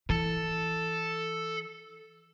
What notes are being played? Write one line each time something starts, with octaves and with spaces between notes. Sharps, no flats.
E3 A4